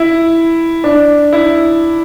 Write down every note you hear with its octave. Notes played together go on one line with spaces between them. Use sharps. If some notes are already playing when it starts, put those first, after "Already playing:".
Already playing: E4
D4
E4